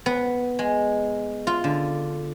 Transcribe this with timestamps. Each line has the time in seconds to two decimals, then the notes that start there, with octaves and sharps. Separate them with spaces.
0.06 B3
0.59 G#3
1.47 F4
1.64 D3